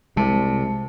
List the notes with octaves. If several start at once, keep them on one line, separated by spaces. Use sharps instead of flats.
C2 C3 G#3 A5